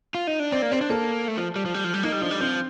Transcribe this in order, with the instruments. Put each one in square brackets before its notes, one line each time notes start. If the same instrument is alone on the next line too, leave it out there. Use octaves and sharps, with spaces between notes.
[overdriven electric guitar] F4
D#4
D4
[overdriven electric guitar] C4 [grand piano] D5
[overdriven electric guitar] A#3
[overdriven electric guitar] C4 [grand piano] C5
[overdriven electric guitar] D4
[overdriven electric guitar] A#3 [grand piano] A4
[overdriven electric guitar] A3
F3
G3
F3
G3
F3
G3
[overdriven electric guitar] A#3 [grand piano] D#4
[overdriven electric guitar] G3
[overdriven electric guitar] F3 [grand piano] D4
[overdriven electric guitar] G3
[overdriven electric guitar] F3 [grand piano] C4